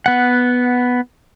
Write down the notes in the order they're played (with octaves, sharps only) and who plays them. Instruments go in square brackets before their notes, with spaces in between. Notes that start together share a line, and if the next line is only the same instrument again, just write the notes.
[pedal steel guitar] B3 F#5